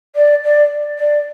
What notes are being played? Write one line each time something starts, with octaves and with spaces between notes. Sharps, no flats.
D5
D5
D5